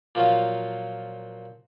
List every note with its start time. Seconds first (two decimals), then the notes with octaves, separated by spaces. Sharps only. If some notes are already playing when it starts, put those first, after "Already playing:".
0.15 A#2 F3 F#3 F4